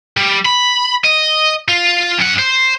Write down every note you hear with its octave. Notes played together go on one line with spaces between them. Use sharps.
G3
B5
D#5
F4
F#2 F#5
C5